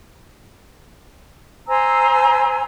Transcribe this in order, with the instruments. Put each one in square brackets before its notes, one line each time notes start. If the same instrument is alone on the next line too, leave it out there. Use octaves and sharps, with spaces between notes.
[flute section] C5 G#5 A#5 E6